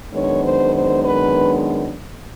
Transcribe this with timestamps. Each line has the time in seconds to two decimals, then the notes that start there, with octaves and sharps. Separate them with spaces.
0.12 F#2 D#3 G#3 B3 D4 C#5
0.43 C5
0.73 C5
1.04 B4